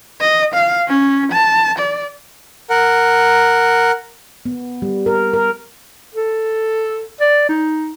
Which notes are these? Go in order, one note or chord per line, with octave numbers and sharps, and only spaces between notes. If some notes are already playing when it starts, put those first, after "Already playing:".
D#5
F5
C#4
A5
D5
A#4 F#5
B3
G3
A#4
A#4
A4
D5
D#4